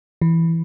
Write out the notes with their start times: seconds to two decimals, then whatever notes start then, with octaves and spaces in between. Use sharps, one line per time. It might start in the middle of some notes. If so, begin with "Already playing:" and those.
0.22 E3